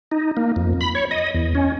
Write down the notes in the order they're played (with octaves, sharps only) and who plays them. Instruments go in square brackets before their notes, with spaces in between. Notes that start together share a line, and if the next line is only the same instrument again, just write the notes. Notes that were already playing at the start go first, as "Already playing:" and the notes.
[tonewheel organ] D#4
A#3
F2
B5
C#5
D#5
E2
C#4